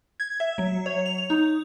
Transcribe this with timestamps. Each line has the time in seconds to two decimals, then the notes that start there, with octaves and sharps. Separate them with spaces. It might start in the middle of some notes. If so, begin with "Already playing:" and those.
0.20 G#6
0.40 E5
0.58 F#3
0.86 C#5
1.06 F7
1.30 D#4